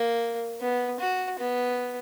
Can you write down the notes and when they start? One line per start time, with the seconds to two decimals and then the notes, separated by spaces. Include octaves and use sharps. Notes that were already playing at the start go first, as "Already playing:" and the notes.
Already playing: A#3
0.60 B3
1.00 F#4
1.39 B3